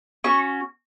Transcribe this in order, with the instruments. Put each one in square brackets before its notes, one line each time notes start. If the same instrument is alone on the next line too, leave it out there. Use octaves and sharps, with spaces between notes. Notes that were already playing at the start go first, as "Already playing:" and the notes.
[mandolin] C#4 F#4 C#6